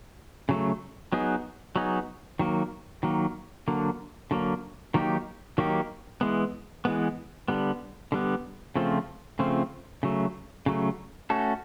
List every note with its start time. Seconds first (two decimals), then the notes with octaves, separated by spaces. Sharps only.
0.49 C#3 F#3 A3
1.12 F#3 B3 D#4 G#4
1.76 F#3 B3 D#4 G#4
2.39 D#3 F#3 A#3
3.03 D#3 F#3 A#3
3.68 D3 F#3 A#3
4.31 D3 F#3 A#3
4.94 D#3 F#3 A#3 D#4 G4
5.58 D#3 F#3 A#3 D#4 G4
6.21 E3 G#3 B3
6.85 E3 G#3 B3
7.48 D3 G3 B3
8.12 D3 G3 B3
8.76 C#3 F3 A3 C4 F4
9.39 C#3 F3 A3 C4 F4
10.03 C#3 F#3 A3
10.66 C#3 F#3 A3
11.30 A3 C#4 F#4 A4